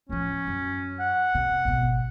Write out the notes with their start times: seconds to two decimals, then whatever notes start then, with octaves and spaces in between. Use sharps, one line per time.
0.10 D1 F3 C#4
0.47 F#2
1.00 F#5
1.35 C3
1.65 G#1 B2